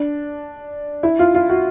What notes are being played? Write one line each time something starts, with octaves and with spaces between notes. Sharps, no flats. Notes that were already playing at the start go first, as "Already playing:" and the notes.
Already playing: D4
E4
F4
F4
F#4